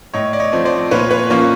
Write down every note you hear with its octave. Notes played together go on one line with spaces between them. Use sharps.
A2 C#5 D#5
D5
C#5 D#5
F3 A3 C4
C5 D5
A#2 B4 C#5
B4 C#5
F3 A#3 C#4